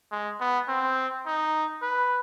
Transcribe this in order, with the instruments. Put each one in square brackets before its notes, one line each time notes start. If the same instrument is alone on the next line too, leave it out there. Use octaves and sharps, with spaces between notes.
[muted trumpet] G#3
B3
C4
D#4
B4